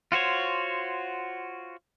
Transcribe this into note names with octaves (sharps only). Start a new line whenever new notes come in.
F4 F#4 C5 C#5